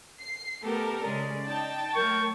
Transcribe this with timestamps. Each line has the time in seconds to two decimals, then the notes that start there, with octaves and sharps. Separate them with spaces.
0.20 C7
0.64 A3 B3 G4 A4 A#4
1.01 C#3 G#3 C#4 D5
1.46 D#4 G5 A5 A6
1.95 F#3 A3 A#4 C#6 G6